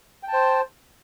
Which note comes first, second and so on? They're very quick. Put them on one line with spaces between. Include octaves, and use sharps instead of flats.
G5 A5 C5